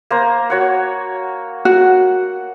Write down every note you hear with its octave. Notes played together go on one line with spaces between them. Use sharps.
A#3 C5 A#5
F#4 C#5 F#5
F#4 F#5